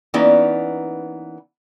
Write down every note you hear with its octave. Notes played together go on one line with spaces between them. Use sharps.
E3 A#3 B3 C#4 D#4 D5